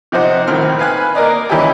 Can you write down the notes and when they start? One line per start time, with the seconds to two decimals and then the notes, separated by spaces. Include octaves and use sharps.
0.12 C3 F3 D#4 C5 F#5
0.47 A#1 A2 D#3 C4 F6
0.79 B4 F5 G#5 B5 F#6
1.15 A#3 A#4 D5 D#5
1.49 E3 C#4 D#4 G4 G5 G#5